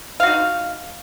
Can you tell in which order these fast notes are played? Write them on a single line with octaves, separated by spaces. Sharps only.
F5 F#4 D#4